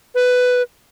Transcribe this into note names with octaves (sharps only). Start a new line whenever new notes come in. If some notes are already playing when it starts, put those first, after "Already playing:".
B4